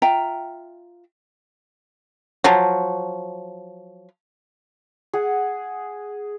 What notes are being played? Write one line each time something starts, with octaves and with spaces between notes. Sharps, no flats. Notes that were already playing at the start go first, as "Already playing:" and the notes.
F4 E5 G5 A#5
F3 F#3
G#4 F#5